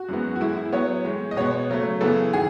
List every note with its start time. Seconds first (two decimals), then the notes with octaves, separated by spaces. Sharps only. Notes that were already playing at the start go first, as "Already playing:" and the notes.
Already playing: F#4
0.09 F#2 E3 G#3 B3
0.36 F#4
0.41 A2 E3 G#3 E4
0.57 E4
0.72 A2 F#3 B3 C#5
1.05 A2 E3 G#3
1.31 D#5
1.37 B2 G#3 B3 C#5
1.70 C#3 F#3 A3
2.01 F#2 C#3 E3 B3 A4
2.34 D#3 G#4